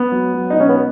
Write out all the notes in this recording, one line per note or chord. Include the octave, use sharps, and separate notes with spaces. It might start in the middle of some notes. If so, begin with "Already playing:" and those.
Already playing: B3
F#3
F#3
D#4
B2 C#4
B3